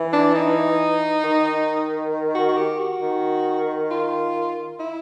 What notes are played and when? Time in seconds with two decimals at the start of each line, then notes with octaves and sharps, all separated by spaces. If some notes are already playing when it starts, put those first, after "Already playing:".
Already playing: E3
0.13 D4
0.35 D#4
1.24 D#3
2.35 F#4
2.49 F#4
2.57 G4
2.79 F#4
3.02 D#3
3.91 F4
4.80 E4